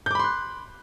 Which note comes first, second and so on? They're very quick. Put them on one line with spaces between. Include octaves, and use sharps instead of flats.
G6 D6 B5 C6 F#6